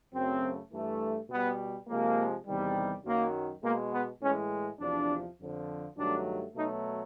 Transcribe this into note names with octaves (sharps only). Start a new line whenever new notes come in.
F#2 C#3 F#3 A3 C4
G2 E3 A3
B2 G3 B3
C3 F3 G#3 A#3
E2 C3 D#3 G3
F#2 D#3 F#3 A#3
B2 G#3 A#3
B3
A2 E3 G#3 C#4
E2 C3 F3 D4
F2 D3 F3
G2 D#3 F#3 A3 D4
B2 F#3 A3 D#4